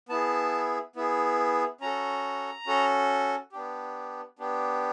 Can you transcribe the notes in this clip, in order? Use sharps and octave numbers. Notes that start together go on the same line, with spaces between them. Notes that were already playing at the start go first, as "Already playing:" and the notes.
B3 E4 G#4 A5
B3 E4 G#4
C#4 F#4 A4 A#5
C#4 F#4 A4
B3 D4 G4
B3 D4 G4